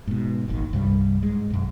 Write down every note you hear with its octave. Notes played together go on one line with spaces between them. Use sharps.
G#2 B2
D#1 G#1 D#2 D#3
C2 G2 F3 G3
G#2 G#3
B1 F#2